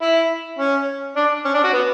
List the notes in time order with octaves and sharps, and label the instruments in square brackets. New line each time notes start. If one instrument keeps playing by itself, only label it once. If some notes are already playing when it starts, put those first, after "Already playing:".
[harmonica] E4
C#4
D4
C#4
D4
F#4
B3